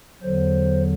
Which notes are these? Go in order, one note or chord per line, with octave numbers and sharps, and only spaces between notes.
E2 D3 F#3 C5